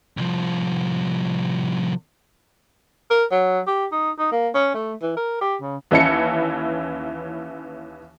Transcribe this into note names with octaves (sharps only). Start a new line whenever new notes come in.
C2 F3
A#4
F#3
G4
D#4
D#4
A#3
C#4
A3
E3
A#4
G4
C#3
D#2 E3 C#4 E4 A5 C#7